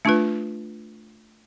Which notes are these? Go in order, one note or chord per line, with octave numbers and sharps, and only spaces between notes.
A3 D4 F4 B4